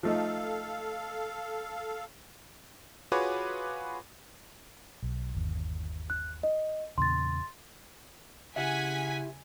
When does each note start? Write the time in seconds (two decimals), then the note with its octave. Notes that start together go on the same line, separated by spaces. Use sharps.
0.03 F3 A3 D#4 A4 F5
3.12 F4 F#4 G#4 B4 C#5 D6
5.03 B1
5.35 G1 D#2
6.10 F#6
6.43 D#5
6.98 E2 A#2 C#3 C6 A6
8.56 C#3 E4 G4 E5 F#5 G#5 B6